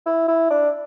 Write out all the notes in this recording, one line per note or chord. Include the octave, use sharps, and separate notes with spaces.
E4
E4
D4